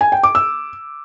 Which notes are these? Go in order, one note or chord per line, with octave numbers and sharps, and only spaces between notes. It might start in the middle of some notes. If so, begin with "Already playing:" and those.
G#5
G5
D6
E6